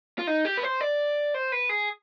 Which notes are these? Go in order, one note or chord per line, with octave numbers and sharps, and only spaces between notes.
F4
D#4
G4
B4
C5
D5
C5
B4
G#4